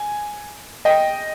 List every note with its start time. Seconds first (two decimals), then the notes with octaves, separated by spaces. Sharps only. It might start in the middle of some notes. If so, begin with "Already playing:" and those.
Already playing: G#5
0.85 D#5 G5